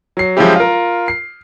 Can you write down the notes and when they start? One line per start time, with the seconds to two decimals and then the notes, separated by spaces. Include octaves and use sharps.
0.17 F#3 C7
0.37 F3 F#3 G#3 C#4 E4 G4
0.56 F4 A#4
1.08 C7